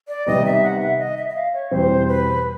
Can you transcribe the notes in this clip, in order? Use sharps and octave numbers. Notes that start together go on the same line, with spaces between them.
D5
C3 D#3 G3 B3 D#5
E5
F#5
E5
D#5
E5
E5
F5
C#5
E2 B2 G3 C4 C5
B4